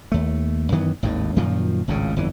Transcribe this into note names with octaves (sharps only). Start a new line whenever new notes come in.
D#2 A3
F#2 D#3 E3 B3
G#1 D#2 A2
F#2 A#2 D#3 F3
G#1 C#2 A2 C#3
G1 F2 E3